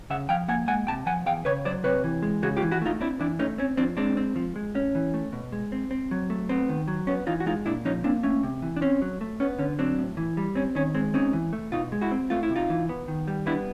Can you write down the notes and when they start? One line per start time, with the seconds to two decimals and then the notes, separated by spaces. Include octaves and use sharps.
0.10 C#3 E5 F#5
0.29 F3 F5 G5
0.48 A#3 F#5 G#5
0.68 G#3 F#5 G#5
0.87 C3 G5 A5
1.06 F3 F#5 G#5
1.26 E2 F5 G5
1.45 C#3 B4 C#5
1.65 F#3 C5 D5
1.84 C3 B4 C#5
2.04 E3
2.23 G#3
2.42 C#3 F#4 G#4
2.57 F4 G4
2.62 E3
2.71 E4 F#4
2.81 A3 D#4 F4
3.01 C4 D4 E4
3.20 E3 D4 E4
3.39 A3 C#4 D#4
3.58 C4 C#4
3.77 F3 C4 D4
3.97 G#3 C4 D4
4.17 C4
4.36 F3
4.56 G#3
4.75 A2 C#4
4.95 E3
5.14 A3
5.33 B2
5.52 G#3
5.72 C4
5.91 C4
6.11 F#3
6.30 A3
6.49 B3 C4
6.69 D#3
6.88 F#3
7.07 B3 C#4
7.27 E3 D#4 F4
7.40 F#4
7.46 G#3 D#4 F4
7.66 A#2 D4 E4
7.85 F3 C#4 D#4
8.04 A#3 C4 D4
8.23 A3 C#4
8.43 C3
8.62 E3
8.76 D4
8.81 C4 C#4
9.02 F#3
9.21 A3
9.40 B3 C#4
9.59 D3 C#4
9.79 F#3 C4 D4
9.99 A2
10.17 E3
10.37 G3
10.55 C4 C#4
10.75 D#3 C#4
10.95 G#3 C4
11.14 C4 C#4 D#4
11.33 E3
11.53 A3
11.72 B2 D#4 F4
11.92 G#3
12.01 E4 F#4
12.11 C4
12.30 A3 F4
12.43 E4
12.50 C3
12.56 D#4 F4
12.70 E3
12.89 B3
13.08 D#3
13.28 G3
13.46 B3 D4 E4